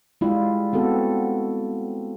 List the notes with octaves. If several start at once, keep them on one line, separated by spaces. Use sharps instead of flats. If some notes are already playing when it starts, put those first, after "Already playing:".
G3 G#3 E4 F4
B3 C4 F#4 A4